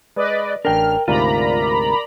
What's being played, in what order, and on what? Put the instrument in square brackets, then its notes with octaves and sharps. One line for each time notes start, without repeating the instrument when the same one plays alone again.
[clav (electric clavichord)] G#3 [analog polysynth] B4 D5 D#5
[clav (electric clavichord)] A1 D4 [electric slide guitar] A#4 G5 [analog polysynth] F6
[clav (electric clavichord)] D2 G#2 C3 [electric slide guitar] F4 [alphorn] A#4 [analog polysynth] D5 A#5 B5